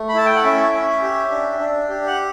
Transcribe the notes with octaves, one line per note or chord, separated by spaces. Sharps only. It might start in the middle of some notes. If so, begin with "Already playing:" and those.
Already playing: A3
B5
E4 A5
G5
F#5
C#4 E5
C#4
G4
D4
D4
G4
F#5